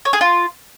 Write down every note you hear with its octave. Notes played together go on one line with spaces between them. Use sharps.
C#5
G#4
F4